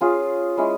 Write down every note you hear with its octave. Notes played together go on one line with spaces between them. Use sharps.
C#4 F4 G#4
G#3 C#4 E4